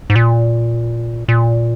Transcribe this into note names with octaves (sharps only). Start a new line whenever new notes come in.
G#2
A#2
A#2